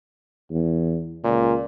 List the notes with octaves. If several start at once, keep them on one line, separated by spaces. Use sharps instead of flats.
E2
C#2 A#2